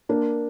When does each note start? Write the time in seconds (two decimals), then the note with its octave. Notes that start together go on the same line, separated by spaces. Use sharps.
0.09 A#3 D4